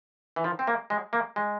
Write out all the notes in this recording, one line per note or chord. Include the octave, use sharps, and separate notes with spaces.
E3
F3
C4
A#3
G#3
A#3
G#3